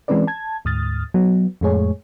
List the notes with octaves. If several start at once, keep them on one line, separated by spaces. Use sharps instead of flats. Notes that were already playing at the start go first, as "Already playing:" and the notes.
E3 G#3 C4 C#4 B4 D5
A5 G#6
D2 G#2 D#6 F6 A6
F#3 B3
F2 A2 G#3 A3 G#4 C#5